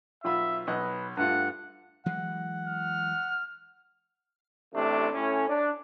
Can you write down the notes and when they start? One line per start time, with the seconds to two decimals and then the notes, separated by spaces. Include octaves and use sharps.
0.24 B1 F4 E5 B5
0.67 B1 B4 D#5 F#6
1.17 G2 A3 F4 F#5
2.06 E3 F#3 G#3 F#5
2.67 F6
4.73 A1 A2 C3 A3 D4
5.13 A2 C#4
5.49 D4